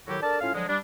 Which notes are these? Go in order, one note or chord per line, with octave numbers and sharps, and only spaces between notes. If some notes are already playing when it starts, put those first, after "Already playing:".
A2 D#3 F#3 E4 F#4 G4
D4 A4 A#4 D5 A5
A2 C#4 F4 F5
D3 F3 F#3 G#3
G3 D4